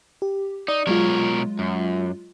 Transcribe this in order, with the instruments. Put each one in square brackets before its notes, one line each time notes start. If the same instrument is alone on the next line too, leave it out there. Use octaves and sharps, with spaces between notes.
[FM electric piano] G4
[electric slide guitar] D#4 [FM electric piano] D5
[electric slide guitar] B2 A#4 C#5 [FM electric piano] F#3 G#3 F4
[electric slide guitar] F#2